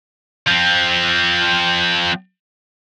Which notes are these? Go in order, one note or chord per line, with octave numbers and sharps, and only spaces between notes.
F3 C4